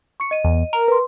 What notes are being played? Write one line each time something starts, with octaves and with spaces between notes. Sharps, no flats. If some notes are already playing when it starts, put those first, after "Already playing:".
C#6 C#7
D#5 D#7
E2
A#4
B4 C6